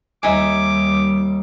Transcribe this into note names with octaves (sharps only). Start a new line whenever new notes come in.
D#2 G3 D#4 E5 G#5 D6